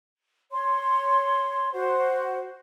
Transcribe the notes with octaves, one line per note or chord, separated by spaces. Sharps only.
C#5 C6
F#4 C5